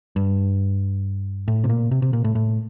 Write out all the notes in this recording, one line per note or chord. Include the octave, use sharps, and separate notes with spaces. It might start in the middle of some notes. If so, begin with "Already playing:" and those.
G2
A2
C3
A#2
C3
C3
A#2
A2
A2